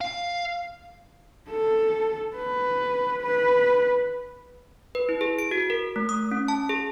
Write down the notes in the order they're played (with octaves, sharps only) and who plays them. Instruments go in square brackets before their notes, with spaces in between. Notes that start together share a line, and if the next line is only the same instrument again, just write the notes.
[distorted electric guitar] F5
[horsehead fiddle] A4
B4
B4
[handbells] B4
E4
G#4
D7
F#4
A#4
A3
D#6
C#4
A5
G#4